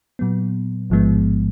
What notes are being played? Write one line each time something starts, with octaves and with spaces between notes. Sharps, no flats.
A#2 F#3 B3
A1 G#2 F3 G#3 B3